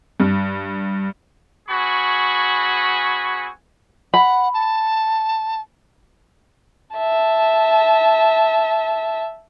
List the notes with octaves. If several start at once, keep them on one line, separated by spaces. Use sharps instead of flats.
G2
C4 F#4 G#4 G#5 B5 C#6
F#5 B5
A5
E5 A5